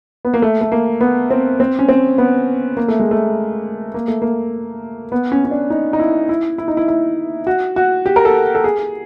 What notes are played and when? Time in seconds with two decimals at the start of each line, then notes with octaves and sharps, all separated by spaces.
0.25 B3
0.34 A#3
0.42 A3
0.61 A3
0.72 A#3
1.01 B3
1.31 C4
1.60 C4
1.79 C#4
1.89 C4
2.18 B3
2.77 A#3
2.88 A3
3.00 G#3
3.11 A3
3.94 A#3
4.08 A3
4.22 A#3
5.12 B3
5.32 C#4
5.45 C#4
5.51 D4
5.70 D#4
5.93 D#4
5.99 E4
6.29 E4
6.58 E4
6.68 D#4
6.77 E4
6.88 E4
7.47 F#4
7.76 F#4
8.06 G4
8.16 A#4
8.25 A4
8.55 A4
8.64 G#4